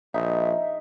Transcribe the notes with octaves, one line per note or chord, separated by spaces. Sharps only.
A#1 D#4 E5